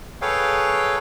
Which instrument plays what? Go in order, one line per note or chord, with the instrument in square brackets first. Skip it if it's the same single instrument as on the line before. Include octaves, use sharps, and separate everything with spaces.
[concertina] G#4 A4 B4 C#5 F5 G5